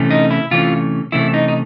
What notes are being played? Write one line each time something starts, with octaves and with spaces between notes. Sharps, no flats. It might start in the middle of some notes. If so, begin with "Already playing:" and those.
Already playing: C3 E3 A3 C#4
D#4
E4
C3 E3 A3 C#4 F4
C3 E3 A3 C#4 E4
D#4
D#4